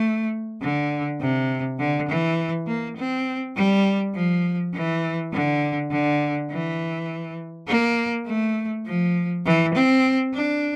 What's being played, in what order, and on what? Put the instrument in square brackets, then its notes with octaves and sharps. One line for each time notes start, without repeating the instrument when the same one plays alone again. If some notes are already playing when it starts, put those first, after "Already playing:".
Already playing: [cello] A3
D3
C3
D3
E3
A#3
C4
G3
F3
E3
D3
D3
E3
A#3
A3
F3
E3
C4
D4